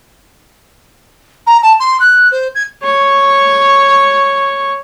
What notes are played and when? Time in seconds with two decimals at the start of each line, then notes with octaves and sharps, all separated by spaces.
1.46 A#5
1.62 A5
1.79 C6
2.00 F#6
2.31 C5
2.55 G#6
2.83 C#5 C#6